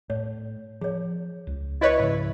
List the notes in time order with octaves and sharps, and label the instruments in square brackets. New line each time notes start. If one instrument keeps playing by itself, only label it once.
[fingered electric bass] A2 [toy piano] C#5
[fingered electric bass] F3 [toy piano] G#4 C#5
[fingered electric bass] C#2
[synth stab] E4 B4 C#5 [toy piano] D#5
[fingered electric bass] G#2 C#3 F3 [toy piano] E5